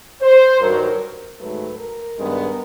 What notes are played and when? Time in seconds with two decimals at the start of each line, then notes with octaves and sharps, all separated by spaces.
0.22 C5
0.61 G2 D#3 F#3 A#4
1.39 G#2 D#3 F#3 A3 B4
1.78 A#4
2.18 G2 D#3 G#3 B3